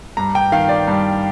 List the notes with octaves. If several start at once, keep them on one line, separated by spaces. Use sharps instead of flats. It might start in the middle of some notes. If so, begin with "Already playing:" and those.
G2 A#5
G5
D#3 F5
D5
G2